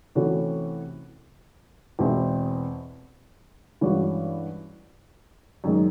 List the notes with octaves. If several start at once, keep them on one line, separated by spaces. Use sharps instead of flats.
C3 E3 A3 C#4 F#4
E2 B2 G#3 C4 E4
G2 E3 G#3 C#4 F#4
F#2 D#3 G#3